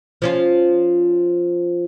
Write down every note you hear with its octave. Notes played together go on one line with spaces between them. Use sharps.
F3 C#4 F4